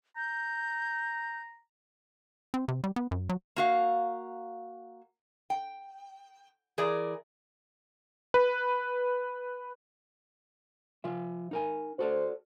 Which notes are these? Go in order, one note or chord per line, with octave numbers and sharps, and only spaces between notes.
A#5 G6
C4
C3
G3
B3
F#2
F#3
A#3 F#4 F5
G5
E3 G#4 A#4 D5
B4
F3 F4 E5
D#4 A#4 G#5
F#4 A4 C5 D5